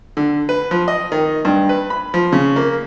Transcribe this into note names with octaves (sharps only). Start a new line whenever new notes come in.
D3
B4
F3
D#5
D#3
G2
B4
B5
F3
C#3
A#3